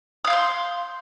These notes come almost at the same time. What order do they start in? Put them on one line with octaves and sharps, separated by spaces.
D#6 F5 G6 C6